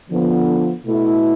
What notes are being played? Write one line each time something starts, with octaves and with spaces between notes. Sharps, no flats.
D3 F3 B3
B2 A3 E4